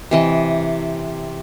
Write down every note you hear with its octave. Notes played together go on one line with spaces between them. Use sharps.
C3 E3 D#5